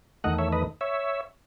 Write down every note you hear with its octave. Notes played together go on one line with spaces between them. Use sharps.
E2 D#3 A3 D#5 F#5
C#5 E5
B4 D#5
C#5 E5